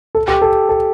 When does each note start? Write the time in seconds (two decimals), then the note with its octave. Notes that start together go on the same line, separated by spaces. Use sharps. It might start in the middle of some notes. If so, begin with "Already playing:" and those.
0.15 A4
0.28 G4
0.42 A4
0.69 A4